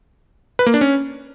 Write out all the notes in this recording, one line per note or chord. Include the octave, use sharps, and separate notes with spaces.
B4
A#3
D4
C#4